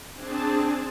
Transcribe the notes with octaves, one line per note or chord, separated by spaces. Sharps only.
C4 D4 G#4 A5